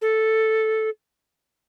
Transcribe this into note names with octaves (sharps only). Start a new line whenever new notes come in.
A4